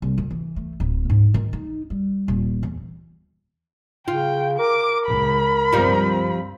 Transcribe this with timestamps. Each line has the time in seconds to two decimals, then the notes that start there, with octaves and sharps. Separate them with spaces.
0.02 C2
0.18 D3
0.31 E3
0.56 A3
0.80 D1
1.10 G#2
1.34 D#3
1.53 D#4
1.90 G3
2.28 D#1
2.63 E2
4.08 C#3 F4 G5
4.59 A#4 D6
5.06 C#2 B5
5.73 G2 F3 G3 C4